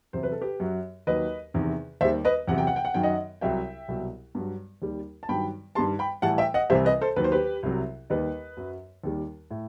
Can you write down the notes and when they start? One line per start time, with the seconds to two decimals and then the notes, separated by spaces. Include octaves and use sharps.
0.13 E2 C3 F#3 C5
0.23 B4
0.32 A4
0.41 G4 B4
0.60 F#2 F#3
1.07 D#2 D#3 F#3 B4 D#5
1.54 E2 C3 D#3
2.01 D#2 D#3 G3 C5 E5
2.25 B4 D#5
2.48 E2 C3 F#3 F#5
2.58 G5
2.67 F#5
2.76 G5
2.85 F#5
2.94 F#2 D#3 F#3 G5
3.03 D#5 F#5
3.41 C2 C3 F#3 E5 G5
3.88 C2 B2 F#3
4.35 G2 F#3
4.82 D#2 D#3 G3
5.23 A5
5.29 G2 D#3 F#3 G5 B5
5.75 G2 D#3 G3 A5 C6
5.99 G5 B5
6.22 A2 E3 G3 F#5 A5
6.38 E5 G5
6.54 D#5 F#5
6.70 C2 C3 E3 G3 C5 E5
6.85 B4 D#5
7.01 A4 C5
7.16 D#2 D#3 F#3 B4
7.24 C5
7.32 G4 B4
7.63 C2 C3 F#3
8.10 D#2 D#3 G3 B4 D#5
8.57 F#2 F#3
9.04 D#2 D#3 G3
9.51 A2